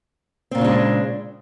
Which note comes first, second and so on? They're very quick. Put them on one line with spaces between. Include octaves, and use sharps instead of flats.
C4 A#2 C#3 D4 G#3